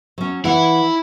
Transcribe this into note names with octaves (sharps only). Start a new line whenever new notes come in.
F#3 C#4
E3 E4 F#5